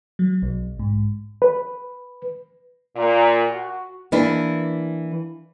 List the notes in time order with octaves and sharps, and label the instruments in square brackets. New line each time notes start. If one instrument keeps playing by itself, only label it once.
[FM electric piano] F#3
B1
G#2
[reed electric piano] B4
[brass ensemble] A#2
F#4
[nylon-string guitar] E3 A#3 D4 E4